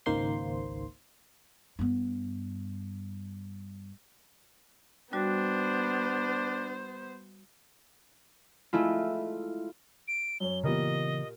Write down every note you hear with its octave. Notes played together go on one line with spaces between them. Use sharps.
G#1 C#2 D#3 A#3 C5 C6
G2 B3
G3 B3 D4 F#4 C5
G#3 A3 E4 F4
D7
F#2 C#5 G7
A#2 C#3 E3 B3 G4 A#4 D#5